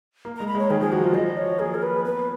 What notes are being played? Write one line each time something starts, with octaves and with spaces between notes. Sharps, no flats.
A#3
G#3 A#5
B5
G#3 C#5
D#3 G#4
F3 G#4
F#3 F#4
F3 F4
F3 D#5
C#5
A#3 G#4
A#4
B4
B3 B4